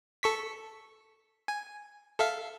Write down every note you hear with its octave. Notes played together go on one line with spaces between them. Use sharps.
A4 C#6 B6
G#5
A4 E5 F5